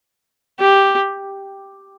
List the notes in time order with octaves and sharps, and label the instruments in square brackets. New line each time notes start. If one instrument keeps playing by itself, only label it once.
[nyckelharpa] G4